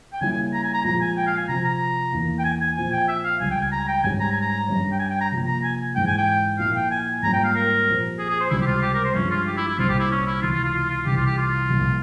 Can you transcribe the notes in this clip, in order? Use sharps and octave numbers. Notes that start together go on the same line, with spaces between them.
G5
C#3 G3 A#3 C#4 E4 G#5
G#5
A#5
G#5
A#5
A#2 F3 G#3 A#5
G#5
G5
F5
G#5
C3 F3 C4 A#5
A#5
E2 E3 A#3
G5
G#5
G#5
A#2 F3 C4 F4 G#5
G5
E5
F5
C#2 C#3 G3 G#5
G5
G#5
A#5
G5
G#2 G3 C#4 G4 G#5
A#5
G#5
A#5
G2 G3 C#4
G5
G#5
G5
A#5
C3 F3 A#3
A#5
G#5
G#2 E3 G#3 C4 G5
G#5
G5
A#2 F3 A#3 E4 F5
G5
G#5
G#2 G3 A#3 C#4 F4 A#5
G5
F5
A#4
A#2 F3 C4 G4
G#4
G#4
C5
C#2 C3 G3 C4 E4
G4
F4
G4
A#4
C5
G2 F3 G#3 C#4
F4
G4
E4
E4
C2 A#2 G3 C4 F4
G4
E4
C#4
E4
C#2 C3 E3 F4
F4
F4
F4
F4
C2 C3 E3 G4
F4
G4
F4
C2 A#2 F3